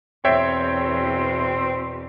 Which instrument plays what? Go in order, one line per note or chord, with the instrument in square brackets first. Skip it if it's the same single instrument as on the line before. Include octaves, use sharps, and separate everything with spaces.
[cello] E2 B2 [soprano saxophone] C4 [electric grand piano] C#5 E5 G5